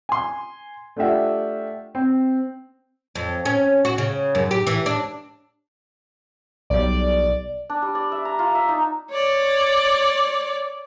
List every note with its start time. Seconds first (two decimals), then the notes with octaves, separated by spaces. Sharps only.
0.09 G#5 C6
0.96 A3 D4 F4 G4 E5 F#5
1.95 C4
3.15 F2
3.45 C#4
3.85 F#4
3.98 C#3
4.35 F#2
4.51 G4
4.67 E3
4.86 D4
6.70 B1 G3 D5
7.70 D4
7.82 G3
7.95 D5
8.12 E5
8.25 A#5
8.39 F4
8.55 E5
8.69 D#4
9.11 C#5 D5